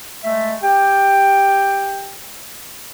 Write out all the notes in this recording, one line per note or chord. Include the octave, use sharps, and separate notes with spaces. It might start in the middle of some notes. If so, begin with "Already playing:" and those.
G#3 A3 E5
G4 G5